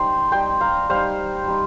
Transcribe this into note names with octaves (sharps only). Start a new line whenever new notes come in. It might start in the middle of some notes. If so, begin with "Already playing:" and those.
Already playing: G3 D#4 C5 G5 C6
G3 D#4 G5 C6
F5 A#5
G3 D#4 C5 F5
G3 D#4